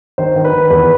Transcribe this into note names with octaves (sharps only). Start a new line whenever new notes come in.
D#3 C5
D#3
B4
D#3
E2 B4